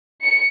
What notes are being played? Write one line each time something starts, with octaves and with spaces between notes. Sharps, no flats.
C#7